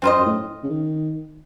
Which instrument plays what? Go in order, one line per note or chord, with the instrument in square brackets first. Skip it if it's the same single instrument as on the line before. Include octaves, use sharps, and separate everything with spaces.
[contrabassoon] F#2 [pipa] C4 F4 C5 D#5
[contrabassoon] F#2
A2
C#3
D#3